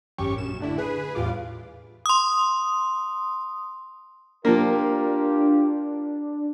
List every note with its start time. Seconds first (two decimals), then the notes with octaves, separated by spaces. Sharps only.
0.18 G#1 F#2 C#4 G4 C#6
0.37 A#1 F#2 E7
0.60 A2 D3 D4 E4
0.78 G#4 B4
1.15 E2 A2 G3 F4 F5 D6
2.06 C6 D#6
4.45 F3 A#3 D4 F4 G4 A#4